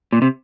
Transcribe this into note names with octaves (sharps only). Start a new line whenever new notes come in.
A#2
C3